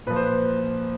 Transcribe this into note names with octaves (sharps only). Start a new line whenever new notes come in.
A#2 F3 B4
C5
B4